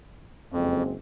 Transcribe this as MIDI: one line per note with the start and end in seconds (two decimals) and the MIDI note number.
0.52 0.92 30
0.52 0.83 41
0.52 0.92 56
0.52 0.92 60